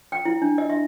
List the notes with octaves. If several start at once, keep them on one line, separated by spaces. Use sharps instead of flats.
G5
E4
D4
D#5
E5